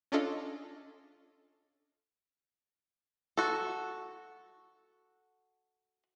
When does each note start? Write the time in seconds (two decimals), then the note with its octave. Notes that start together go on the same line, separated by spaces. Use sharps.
0.12 C#4 D4 F4 A4 D#5
3.37 F#4 A4